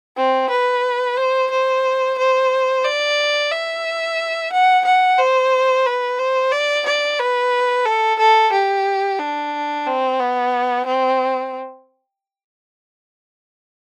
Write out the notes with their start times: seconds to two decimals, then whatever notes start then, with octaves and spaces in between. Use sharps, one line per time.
0.17 C4
0.51 B4
1.17 C5
1.51 C5
2.18 C5
2.85 D5
3.52 E5
4.52 F#5
4.85 F#5
5.18 C5
5.86 B4
6.19 C5
6.52 D5
6.86 D5
7.19 B4
7.86 A4
8.19 A4
8.52 G4
9.19 D4
9.87 C4
10.20 B3
10.86 C4